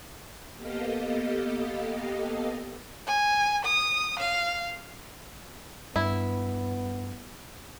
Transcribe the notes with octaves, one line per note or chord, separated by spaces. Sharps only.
A#3 B3 G4 A4 D#5 F5
G#5
D#6
F5
G2 B3 E4